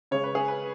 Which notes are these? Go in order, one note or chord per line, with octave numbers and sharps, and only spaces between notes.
C#3 G#3 C#5
B4
G#4
B4